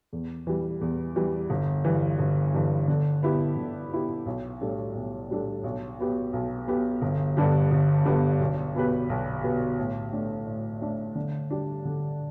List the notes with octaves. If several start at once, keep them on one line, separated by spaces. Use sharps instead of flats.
E2
E3 G3
E2
E3 G3
G1
G2 E3
G1
G2 E3
D3
B3 E4 G4
D3
B3 E4 G4
B1
A2 G3 D4 A4
B1
A2 G3 D4 A4
B1
B2 B3 G4
B1
B2 B3 G4
G1
G2 D3 B3 G4
G1
G2 D3 B3 G4
B1
B2 B3 G4 B4
B1
B2 B3 G4 B4
A2
A3 D4
A2
A3 D4
D3
G3 D4
D3